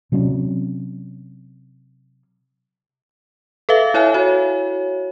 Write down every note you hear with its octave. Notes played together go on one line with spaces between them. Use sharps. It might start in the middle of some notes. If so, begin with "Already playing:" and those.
C3 F#3 C4 C#4
A4 B4 E5 F5
E4 C#5 E5 G#5
F#4 C#5